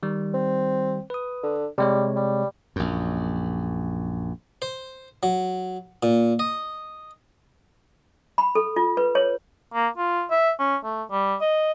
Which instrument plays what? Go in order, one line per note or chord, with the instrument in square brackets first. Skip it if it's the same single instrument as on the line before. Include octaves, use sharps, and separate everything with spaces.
[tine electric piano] D#3 G3
[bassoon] C4
[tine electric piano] B4 D#6
[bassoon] D3
[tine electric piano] C3 G#3 C#5 [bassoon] G3
[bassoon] G3
[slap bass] A#1 F#2
[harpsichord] C5
F#3
A#2
D#5
[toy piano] B5
A4
F4
B4
C#5
[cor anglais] A#3
F4
E5
C#4
A3
G3
D#5